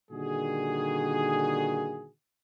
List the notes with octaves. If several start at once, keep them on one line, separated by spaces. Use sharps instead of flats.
A#2 D3 D#3 G3 F#4 G#4